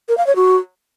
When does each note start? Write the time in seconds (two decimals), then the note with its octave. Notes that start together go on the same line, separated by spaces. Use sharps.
0.09 A#4
0.18 F5
0.27 C#5
0.36 F#4